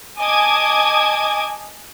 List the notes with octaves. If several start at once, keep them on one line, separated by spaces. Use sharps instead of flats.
D#5 G#5 A5 D6 D#6 G#6